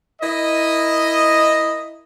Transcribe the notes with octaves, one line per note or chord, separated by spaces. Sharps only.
E4 A#4 D#5